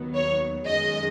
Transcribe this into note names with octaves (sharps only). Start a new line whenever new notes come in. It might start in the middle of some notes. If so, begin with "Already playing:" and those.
Already playing: D#2 D#3 F#3 B3
C#5
F#2 D#3 G#3 D#5